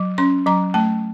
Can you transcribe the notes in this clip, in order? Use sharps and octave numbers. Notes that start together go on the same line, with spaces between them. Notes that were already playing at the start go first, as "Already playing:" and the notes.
Already playing: F#3
C#4 C6
F#3 A#5
A3 A5